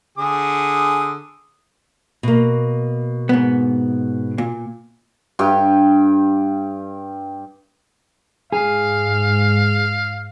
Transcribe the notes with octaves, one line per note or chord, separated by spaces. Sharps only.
D3 G#4 D#6
B2 A#3
G#2 B3
A#2
G2 G4 G5
G#2 G#4 F5